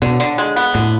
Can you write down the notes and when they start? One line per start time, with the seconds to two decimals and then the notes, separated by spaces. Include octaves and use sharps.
0.02 B2 D3
0.20 D3
0.38 G#3
0.56 B3
0.74 A2 D3